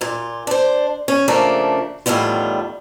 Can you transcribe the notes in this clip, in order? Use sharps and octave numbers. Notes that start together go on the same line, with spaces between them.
A#2 F4
D4 C5
C#4
C#3 F3 A3 A#3 D4
E2 A2 D#3 G3 F4